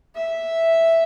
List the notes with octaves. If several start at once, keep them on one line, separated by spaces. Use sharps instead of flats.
E5